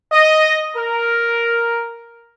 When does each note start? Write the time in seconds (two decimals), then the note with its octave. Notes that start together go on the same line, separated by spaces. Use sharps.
0.12 D#5
0.77 A#4